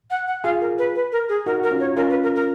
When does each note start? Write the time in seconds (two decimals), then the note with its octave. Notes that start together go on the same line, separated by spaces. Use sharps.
0.11 F#5
0.27 F#5
0.44 F4 G#4 F5
0.61 A#4
0.78 B4
0.95 B4
1.12 A#4
1.29 G#4
1.46 D#4 F#4 A#4
1.59 F#4 A#4
1.71 C#4 F4
1.80 C#5
1.97 C#4 F4 A#4
2.10 B4
2.23 A#4
2.35 A#4